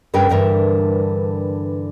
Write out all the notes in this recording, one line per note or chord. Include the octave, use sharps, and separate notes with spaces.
G2 C#3 A#4 B4 G5
G2 D3 E3 A#4 E5